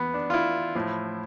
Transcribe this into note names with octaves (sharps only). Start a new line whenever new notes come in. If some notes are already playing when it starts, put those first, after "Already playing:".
Already playing: E2 B3
D4
F4
E4
A2 F3